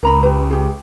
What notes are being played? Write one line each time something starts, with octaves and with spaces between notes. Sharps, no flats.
C#2 A#4 A#5 B5
G4 B4
G4 G#4